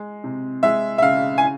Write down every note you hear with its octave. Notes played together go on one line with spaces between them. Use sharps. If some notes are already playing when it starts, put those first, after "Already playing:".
Already playing: G#3
C3
G#3 E5
E5
C#3 F5
G#5